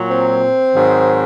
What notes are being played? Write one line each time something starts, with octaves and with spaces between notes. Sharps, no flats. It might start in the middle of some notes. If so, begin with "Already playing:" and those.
Already playing: A#2 F#3
C4
G#2 D#3 F#3